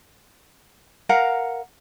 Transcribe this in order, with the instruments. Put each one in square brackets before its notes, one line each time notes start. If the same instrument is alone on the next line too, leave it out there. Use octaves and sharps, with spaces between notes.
[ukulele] A#4 F5 F#5 A#5